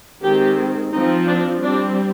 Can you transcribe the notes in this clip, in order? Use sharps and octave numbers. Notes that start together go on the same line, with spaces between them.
D#3 G#3 C4 G4
F3 C4 D#4
D4
G3 C4 D4